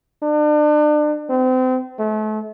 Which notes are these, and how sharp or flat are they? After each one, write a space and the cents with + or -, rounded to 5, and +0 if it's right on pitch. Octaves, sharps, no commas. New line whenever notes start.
D4 +35
C4 -35
A3 -35